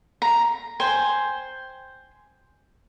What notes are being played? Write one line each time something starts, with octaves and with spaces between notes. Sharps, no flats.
A#5
C5 G5 G#5